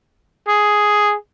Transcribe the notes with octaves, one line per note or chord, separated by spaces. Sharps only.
G#4